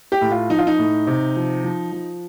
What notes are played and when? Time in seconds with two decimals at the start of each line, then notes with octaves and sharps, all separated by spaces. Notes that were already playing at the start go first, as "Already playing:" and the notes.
0.12 G4
0.21 A2
0.31 F4
0.50 F3 D#4
0.58 F4
0.67 D#4
0.79 A2
1.07 C3
1.36 F3
1.64 F3
1.92 F3